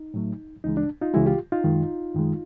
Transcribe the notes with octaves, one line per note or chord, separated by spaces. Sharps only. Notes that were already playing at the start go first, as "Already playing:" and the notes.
Already playing: D#4
A2 F#3 A3
C#2 C#3 E3 G#3 D#4
D4
D#4 F4
C#2 C#3 E3 G#3 E4 F#4
F4 G4
D#4 F4
F#2 D#3 G#3
F#2 D#3 G#3